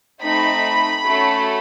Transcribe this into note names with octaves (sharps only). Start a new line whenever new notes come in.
A3 C4 D#4 B5
A3 C#4 F#4 A4